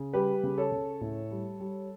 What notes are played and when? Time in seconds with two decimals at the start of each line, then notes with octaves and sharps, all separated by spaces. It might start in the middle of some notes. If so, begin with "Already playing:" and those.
Already playing: C#3
0.13 G3 G4 B4
0.43 C#3
0.58 A4 C#5
0.72 C#3
1.01 A2
1.31 G3
1.60 G3